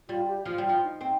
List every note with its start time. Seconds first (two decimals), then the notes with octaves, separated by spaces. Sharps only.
0.08 G3 F4
0.28 G4
0.45 F3 F4
0.58 G3
0.65 F3 F4
0.84 D#4
1.01 C4